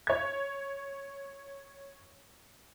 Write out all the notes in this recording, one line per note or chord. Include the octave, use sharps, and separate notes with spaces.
C#5 G#6